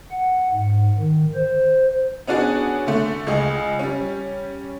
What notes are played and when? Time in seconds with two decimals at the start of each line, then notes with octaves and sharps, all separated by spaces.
0.11 F#5
0.52 G#2
0.99 D#3
1.35 C5
2.27 B3 C#4 D4 F#4 G#4
2.87 D3 A3
3.27 C#2 G#4 D#5
3.79 G3 C#4